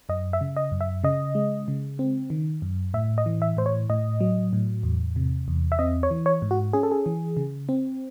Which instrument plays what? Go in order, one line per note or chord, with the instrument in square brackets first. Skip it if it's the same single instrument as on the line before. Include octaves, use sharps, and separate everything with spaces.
[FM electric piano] F#2 D#5
E5
C#3
D#5
F#2
E5
C#3 D#5
G#3
C#3
C4
D#3
F#2
A2 E5
D#5
E3
E5
A2 C5
C#5
A2 D#5
F#3
A2
E2
C3
E2
E5
C4 D#5
C#5
E3
C#5
G#2
F#4
C#4 G#4
A4
G#4
E3
C#3
C4